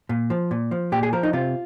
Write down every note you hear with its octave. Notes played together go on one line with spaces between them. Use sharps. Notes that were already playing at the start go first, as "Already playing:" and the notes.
A#2
F3
A#2
F3
A#2 G4
G#4
F3 A#4
D#4
C3 F4